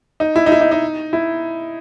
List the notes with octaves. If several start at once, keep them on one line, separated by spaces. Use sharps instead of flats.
D#4
E4
D#4
E4
D#4
D#4
E4